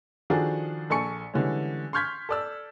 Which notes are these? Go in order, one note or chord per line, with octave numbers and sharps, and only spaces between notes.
D#3 F3 D4 F#4 G#4 A4
A#1 A4 G#5 C#6 C#7
D3 E3 G3 G#3 C#4
C6 C#6 F6 G6 G#6 B6
A4 D5 E6